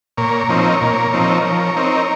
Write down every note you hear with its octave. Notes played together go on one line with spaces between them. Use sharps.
A#2 A#4 C#5
F3 C4 D#4
A#2
F3 C4 D#4
F3
C4 D#4